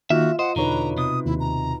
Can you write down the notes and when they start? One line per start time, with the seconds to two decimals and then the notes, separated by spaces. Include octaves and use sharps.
0.10 D#3 A#3 F4 F#4 E5 F6
0.39 C5 D#5 F#5
0.56 E2 B2 D3 D#4 B4 C#5 A#5
0.97 C3 D#6
1.26 D#2 E4
1.40 A#5